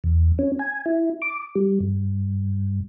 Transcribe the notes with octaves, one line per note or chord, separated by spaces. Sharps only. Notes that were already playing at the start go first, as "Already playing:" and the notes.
E2
C#4
G#5
E4
D6
G3
G2